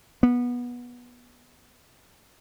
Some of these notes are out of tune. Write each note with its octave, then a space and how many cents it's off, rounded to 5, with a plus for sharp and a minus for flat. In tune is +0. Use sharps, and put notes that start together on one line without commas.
B3 -20